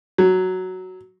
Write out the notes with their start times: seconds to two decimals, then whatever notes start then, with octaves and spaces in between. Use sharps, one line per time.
0.18 F#3